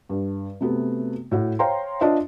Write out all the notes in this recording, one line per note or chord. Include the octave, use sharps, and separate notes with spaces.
G2
C3 A3 B3 F#4
A2 F#4 F#5
C5 C#5 F5 G5 A#5 C6
D4 F4 C5 D#5 E5